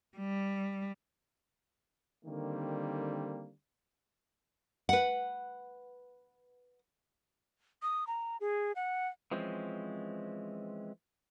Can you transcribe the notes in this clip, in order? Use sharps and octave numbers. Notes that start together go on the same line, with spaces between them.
G3
D3 D#3 G3 A#3 C4
B4 F#5
D#6
A#5
G#4
F#5
E3 F3 G#3 C4 C#4